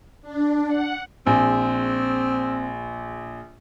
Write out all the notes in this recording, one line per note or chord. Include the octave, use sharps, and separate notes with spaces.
D4
F#5
A#1 C4